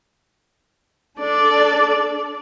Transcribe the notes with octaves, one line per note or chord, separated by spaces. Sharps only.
D4 A4 D5